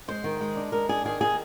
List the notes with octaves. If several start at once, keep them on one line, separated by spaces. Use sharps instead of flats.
G#3 C5
D#3
G#3
D4
G#3 A#4
D4 G#4
D#3 G#4
D#3 G#4